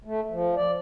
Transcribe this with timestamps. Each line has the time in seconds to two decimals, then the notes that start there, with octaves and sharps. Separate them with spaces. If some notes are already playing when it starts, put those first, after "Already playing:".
0.05 A3
0.31 F3
0.56 D5